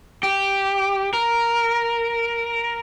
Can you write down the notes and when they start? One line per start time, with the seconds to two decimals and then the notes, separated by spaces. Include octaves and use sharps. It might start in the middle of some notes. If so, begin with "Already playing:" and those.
0.23 G4
1.13 A#4